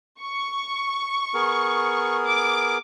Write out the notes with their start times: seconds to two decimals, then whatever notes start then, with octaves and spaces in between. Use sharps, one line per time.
0.20 C#6
1.34 B3 G#4 A#4
2.25 D6